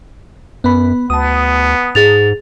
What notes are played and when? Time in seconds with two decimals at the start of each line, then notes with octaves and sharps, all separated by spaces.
0.64 F#2 B3 B5
1.10 D2 B3 A5 D#6
1.95 G#2 G#4 A6 F7